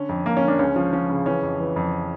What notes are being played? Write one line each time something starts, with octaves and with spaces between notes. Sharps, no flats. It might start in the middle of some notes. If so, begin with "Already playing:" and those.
Already playing: D3 C#4
F2
F2 A#3
C#4
D3
A#3 D4
C#2 C#4
F3 C#4
F3 C#4
C#3
E3 C#4
F2
E3
F2